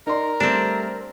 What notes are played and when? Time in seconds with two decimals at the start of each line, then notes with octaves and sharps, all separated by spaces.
0.07 D#4 A#4 D5 C6
0.40 G3 A3 C4 D4